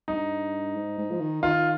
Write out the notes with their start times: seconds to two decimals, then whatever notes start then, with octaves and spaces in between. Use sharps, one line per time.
0.08 G2 D#4
0.75 G#2
0.98 G#2
1.11 F3
1.20 D#3
1.42 D#3 F4